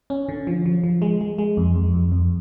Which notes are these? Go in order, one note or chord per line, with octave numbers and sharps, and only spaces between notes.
C#4
D3
F3
F3
F3
G#3
G#3
G#3
F2
F2
F2
F2